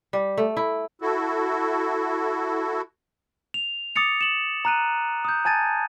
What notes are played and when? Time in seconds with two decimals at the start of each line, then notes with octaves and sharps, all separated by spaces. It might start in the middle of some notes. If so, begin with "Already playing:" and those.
0.13 G3
0.38 A3
0.57 E4
1.02 E4 F#4 A4
3.54 F7
3.96 D6 D#6 A6 C#7 F7
4.21 E7 F#7
4.65 A#5 F#6 D#7
5.25 D#6 G6
5.45 G#5 A5 G#6 A6 D#7